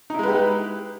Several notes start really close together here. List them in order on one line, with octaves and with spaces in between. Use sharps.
D#4 E4 G#3 B4 G4